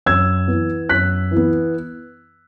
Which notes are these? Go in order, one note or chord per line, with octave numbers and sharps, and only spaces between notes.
F#2 E6 G#6
E3 B3
F#2 F#6 B6
E3 B3